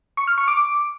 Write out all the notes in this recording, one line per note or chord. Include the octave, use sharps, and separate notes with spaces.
C#6
F6
C#6
D6